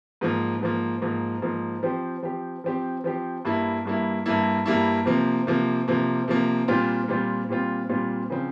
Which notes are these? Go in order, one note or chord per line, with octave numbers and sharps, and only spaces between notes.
G#2 F3 A#3
G#2 F3 A#3
G#2 F3 A#3
G#2 F3 A#3
F3 C4 G4
F3 C4 G4
F3 C4 G4
F3 C4 G4
G2 G3 A#3 E4
G2 G3 A#3 E4
G2 G3 A#3 E4
G2 G3 A#3 E4
C3 F3 A#3
C3 F3 A#3
C3 F3 A#3
C3 F3 A#3
A#2 G3 C4 F4
A#2 G3 C4 F4
A#2 G3 C4 F4
A#2 G3 C4 F4
C#3 F3 C4